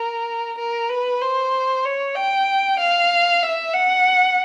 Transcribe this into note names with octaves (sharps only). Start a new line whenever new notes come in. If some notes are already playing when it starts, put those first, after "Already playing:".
Already playing: A#4
A#4
B4
C5
C#5
G5
F5
E5
F#5